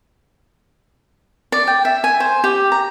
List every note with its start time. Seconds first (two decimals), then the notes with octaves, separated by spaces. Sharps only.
1.52 D5
1.67 G5
1.85 E5
2.04 G#5
2.20 C5
2.44 G4
2.72 A#5